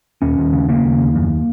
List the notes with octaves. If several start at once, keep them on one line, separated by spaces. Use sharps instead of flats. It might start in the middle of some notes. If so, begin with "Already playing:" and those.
D#2 C#4
D#2
C#3
C#3 A#3
D#2
D#2
F#2